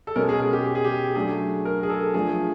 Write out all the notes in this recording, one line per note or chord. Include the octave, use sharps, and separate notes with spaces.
A4
B2 G#3 C#4 A#4
G#4
G#4
G4
G4
G#4
G4
F#3 A3 D4 G#4
A#4
G#4
A4
F3 A3 D4 G#4